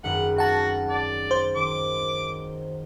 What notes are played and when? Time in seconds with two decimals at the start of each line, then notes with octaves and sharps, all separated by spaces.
0.04 G#1 F#2 B4 F#5
0.38 F#4 F#5 A5
0.89 D5
1.31 C5
1.56 D#3 D6